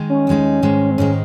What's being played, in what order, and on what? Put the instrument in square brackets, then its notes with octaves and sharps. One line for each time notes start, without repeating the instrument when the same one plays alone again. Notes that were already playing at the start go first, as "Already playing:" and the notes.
Already playing: [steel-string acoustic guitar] D#3 G#3 D#4
[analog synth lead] C#4
[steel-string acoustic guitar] D#2 D#3 G#3 D#4
G#2 D#3 G#3
[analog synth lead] C4
[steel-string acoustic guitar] G#2 D#3 G#3 [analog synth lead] C#4